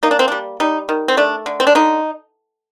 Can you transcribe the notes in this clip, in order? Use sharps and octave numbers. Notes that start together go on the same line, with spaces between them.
A#3 D#4
D4
C4
G3 D4
G3 D#4
D#3
C4
A3 D4
D3
C4
D4
D3 D#4